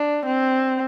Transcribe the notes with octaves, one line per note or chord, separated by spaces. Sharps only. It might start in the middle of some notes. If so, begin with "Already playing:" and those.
Already playing: D4
C4